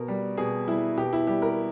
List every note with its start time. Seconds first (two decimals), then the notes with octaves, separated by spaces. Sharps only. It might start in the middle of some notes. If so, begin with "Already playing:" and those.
Already playing: B2 A#4
0.08 G3
0.37 B2 G#4
0.68 G3 E4
0.97 B2 G4
1.13 E4
1.27 G3 G4
1.42 A#4